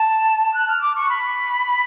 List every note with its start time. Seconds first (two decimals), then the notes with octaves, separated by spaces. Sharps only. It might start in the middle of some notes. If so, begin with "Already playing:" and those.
Already playing: A5
0.53 F#6
0.67 F6
0.81 D6
0.95 C#6
1.09 B5